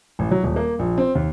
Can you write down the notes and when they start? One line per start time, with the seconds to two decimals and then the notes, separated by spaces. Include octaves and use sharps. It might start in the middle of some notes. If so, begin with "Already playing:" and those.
0.19 A1
0.31 F#3
0.43 D#1
0.56 A#3
0.79 A#1
0.98 C4
1.15 D#2